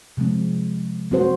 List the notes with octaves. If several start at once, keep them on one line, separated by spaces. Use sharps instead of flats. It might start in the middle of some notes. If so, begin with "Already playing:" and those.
C3 F3 G#3 C4
F#3 C4 F#4 C5